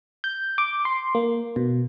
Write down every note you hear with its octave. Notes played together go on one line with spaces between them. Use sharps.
G6
D6
C6
A#3
B2